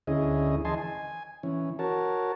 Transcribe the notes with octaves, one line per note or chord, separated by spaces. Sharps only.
D2 C#4 E4 G#4 D#5
E3 D#5 G#5 A5 C6
G#5
E3 C#4
F#4 A#4 C#5 A5